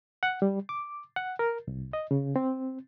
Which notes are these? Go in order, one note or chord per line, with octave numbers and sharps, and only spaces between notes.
F#5
G3
D6
F#5
A#4
C2
D#5
C#3
C4